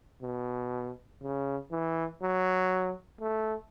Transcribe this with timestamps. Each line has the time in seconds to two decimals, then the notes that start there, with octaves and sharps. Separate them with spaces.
0.22 B2
1.22 C#3
1.71 E3
2.22 F#3
3.21 A3